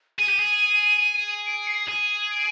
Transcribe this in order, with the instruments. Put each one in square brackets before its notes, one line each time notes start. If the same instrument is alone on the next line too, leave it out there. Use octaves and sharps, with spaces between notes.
[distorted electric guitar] G#4 [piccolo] D#7
[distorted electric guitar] G4
G#4
[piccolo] D7
C7
[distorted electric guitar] G#4 [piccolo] D#7
[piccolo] D#7
D7